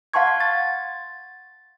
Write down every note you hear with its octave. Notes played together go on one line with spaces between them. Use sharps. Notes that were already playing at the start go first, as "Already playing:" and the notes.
F5 F#5 A5 C6 C#6 G#6
A6